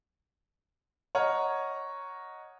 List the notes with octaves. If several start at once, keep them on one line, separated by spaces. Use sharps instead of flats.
C#5 D#5 F#5 A#5 F6